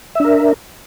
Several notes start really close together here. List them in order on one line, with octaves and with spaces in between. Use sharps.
E5 D4 A#4